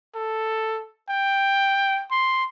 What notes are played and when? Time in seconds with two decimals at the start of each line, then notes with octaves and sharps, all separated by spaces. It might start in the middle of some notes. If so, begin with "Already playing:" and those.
0.15 A4
1.09 G5
2.11 C6